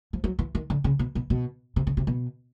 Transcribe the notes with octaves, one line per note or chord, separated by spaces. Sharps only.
F3
F#3
E3
D#3
D3
C#3
B2
B2
B2
C3
C#3
C3
B2